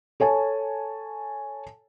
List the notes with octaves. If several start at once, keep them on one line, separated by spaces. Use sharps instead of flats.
A4 C#5 G#5 A5